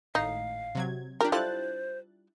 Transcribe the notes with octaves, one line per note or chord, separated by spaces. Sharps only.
G#1 A2 D#4 F5
C3 F#3 G#6
D4 F4 G4 A#4
G3 E4 F4 A4 C5 F#6 A6